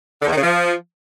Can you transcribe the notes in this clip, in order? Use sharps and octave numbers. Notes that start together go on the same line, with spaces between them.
D3
E2
D#3
C#3
F3